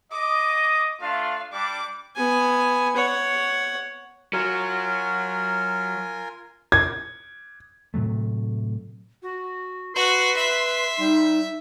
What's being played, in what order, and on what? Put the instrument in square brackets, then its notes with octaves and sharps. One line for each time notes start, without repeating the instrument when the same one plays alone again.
[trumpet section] D#5 D#6 [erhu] D6
[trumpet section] A3 D4 F4 [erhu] F5
[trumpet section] G3 D4 [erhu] D6
[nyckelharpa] B3 G#5
C#5 F#5
[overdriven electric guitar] F#3 [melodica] F4 A#4 G#5
[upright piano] G#6
[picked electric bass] A2 C3 F#3 A3
[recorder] F#4
[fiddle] F#4 [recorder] B4 [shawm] C6
[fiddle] E5
[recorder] G3 [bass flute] D#4